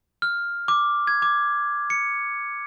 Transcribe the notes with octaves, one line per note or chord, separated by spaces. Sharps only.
F6
D6
G#6
D6
C#7